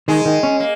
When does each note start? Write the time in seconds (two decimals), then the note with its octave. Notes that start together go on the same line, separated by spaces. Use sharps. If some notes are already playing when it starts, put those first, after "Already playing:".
0.08 D#3 G#3
0.25 D#3
0.43 C#4
0.60 A#3